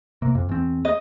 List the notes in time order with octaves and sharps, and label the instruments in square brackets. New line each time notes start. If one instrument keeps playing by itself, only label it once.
[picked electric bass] C3 A#3
F2
E2 C4
[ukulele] D#5